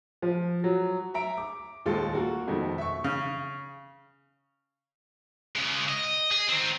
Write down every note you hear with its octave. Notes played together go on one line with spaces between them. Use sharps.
F3
F#3
E5 A#5 D7
D6
A#1 D#2 G#3 F4 A4
A#3 F#4 A#4
F2 B2 D#3 G#3 A3 C4
E5 C#6
C#3
C#3 G#3
D#5
G#4
D#3 C4